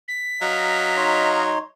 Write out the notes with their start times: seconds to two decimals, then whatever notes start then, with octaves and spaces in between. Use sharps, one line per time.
0.08 B6
0.41 F#3 D#5 F5 A#5
0.97 D#4 C#5 C6